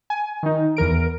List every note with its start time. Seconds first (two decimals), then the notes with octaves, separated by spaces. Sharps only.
0.10 G#5
0.43 D#3 D#4
0.77 E2 E3 A#4 D7